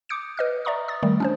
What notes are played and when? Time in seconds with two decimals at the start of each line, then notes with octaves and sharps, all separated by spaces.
0.09 D6 D#6 G6 C#7 D7
0.37 B4 D#5 F6
0.65 D5 E5 A#5 C#6 D#6
0.88 D#6 A6
1.03 D#3 G3 A3
1.20 C#4 D4 C5